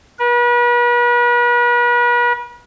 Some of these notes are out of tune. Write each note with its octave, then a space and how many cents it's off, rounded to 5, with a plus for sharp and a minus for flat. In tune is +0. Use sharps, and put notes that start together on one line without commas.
B4 -40